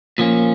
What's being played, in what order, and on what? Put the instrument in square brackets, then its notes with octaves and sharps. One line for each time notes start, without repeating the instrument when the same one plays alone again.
[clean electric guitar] A#2 F3 A#3 C#4